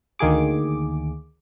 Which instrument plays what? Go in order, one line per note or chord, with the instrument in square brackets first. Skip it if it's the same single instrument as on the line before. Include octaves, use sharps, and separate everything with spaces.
[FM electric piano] D2 D#3 A#3 G#4 D6